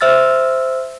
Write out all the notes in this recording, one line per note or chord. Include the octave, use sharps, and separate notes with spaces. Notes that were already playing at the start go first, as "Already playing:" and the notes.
C5 E5 E6 F6 A6